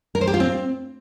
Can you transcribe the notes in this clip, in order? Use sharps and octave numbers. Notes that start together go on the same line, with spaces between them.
A#4
C5
G4
F4
C4